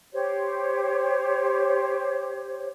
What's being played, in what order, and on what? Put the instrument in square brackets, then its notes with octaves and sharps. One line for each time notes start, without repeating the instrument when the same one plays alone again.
[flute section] G4 C5 C#5